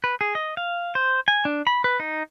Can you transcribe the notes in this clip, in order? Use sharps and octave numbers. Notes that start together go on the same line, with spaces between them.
B4
G#4
D#5
F5
C5
G#5
D4
B5
B4
D#4